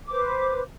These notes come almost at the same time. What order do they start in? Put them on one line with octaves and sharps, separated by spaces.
D6 C5 B4